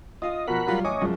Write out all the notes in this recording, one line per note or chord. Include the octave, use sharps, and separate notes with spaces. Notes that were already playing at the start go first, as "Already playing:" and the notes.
F4 D#5 F5
B2 F3 A#4 F#5 B5
F#3 G3 F4
A1 C#5 D#5 G#5 D6
F#2 F3 G#3